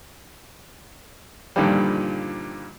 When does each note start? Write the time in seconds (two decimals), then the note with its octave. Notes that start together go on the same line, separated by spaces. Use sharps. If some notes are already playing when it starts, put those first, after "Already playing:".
1.56 G2 A#2 D3 D#3 F3 G3